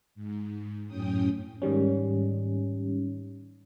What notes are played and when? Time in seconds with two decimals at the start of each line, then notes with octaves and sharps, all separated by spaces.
0.15 G#2
0.86 F#2 A2 C#4 G5 D#6
1.62 G#2 D#3 G3 C#4